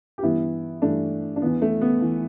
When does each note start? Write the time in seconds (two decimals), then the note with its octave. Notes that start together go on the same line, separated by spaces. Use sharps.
0.18 G4
0.22 G2 E3 B3 E4
0.82 G2 E3 A3 D4
1.36 D4
1.42 E2 E3 B3
1.62 A3
1.81 B3
2.01 E3